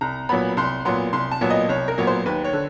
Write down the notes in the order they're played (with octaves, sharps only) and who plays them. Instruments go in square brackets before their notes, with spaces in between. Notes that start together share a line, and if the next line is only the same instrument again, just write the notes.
[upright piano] C2 A#5
A#2 F#3 B3 B5
C2 C6
A#2 F#3 B3 C6
C2 C6
A5
A#2 F#3 B3
D#5
C2 C#5
A#4
A#2 F#3 B3 C#5
C5
D#2 B4
C#5
D3